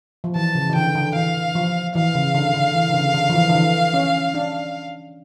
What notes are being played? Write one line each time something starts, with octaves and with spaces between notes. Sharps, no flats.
F3
E3 A5
C#3
E3
D3 G5
D3
E3 F5
F3
E3 F5
C#3
D3
D3
E3
D3
C#3
D3
F3
E3
D3
E3
C#4
D4